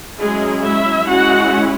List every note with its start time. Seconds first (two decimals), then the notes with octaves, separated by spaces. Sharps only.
0.20 F#3 G#3 C#4 E4 G#4
0.64 E4 E5
1.08 G#3 C#4 E4 F#4 F#5